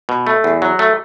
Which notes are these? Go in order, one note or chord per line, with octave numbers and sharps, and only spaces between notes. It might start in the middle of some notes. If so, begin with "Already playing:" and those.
B2
A3
E2
F#3
A3